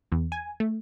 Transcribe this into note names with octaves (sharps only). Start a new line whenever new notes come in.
E2
G#5
A3